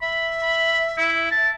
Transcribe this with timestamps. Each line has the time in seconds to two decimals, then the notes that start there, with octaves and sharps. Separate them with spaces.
0.01 E5 B5
0.42 B5
0.98 E4
1.31 A5